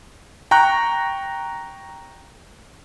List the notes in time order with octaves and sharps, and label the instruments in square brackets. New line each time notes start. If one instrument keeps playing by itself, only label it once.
[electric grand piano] G5 A#5 C#6 F#6